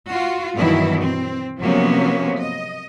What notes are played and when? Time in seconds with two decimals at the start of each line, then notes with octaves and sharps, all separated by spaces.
0.11 F4 F#4
0.57 G2 B2 D#3 E3 F#3 E4
1.00 C4
1.60 C3 F3 F#3 A#3 B3 C#4
2.38 D#5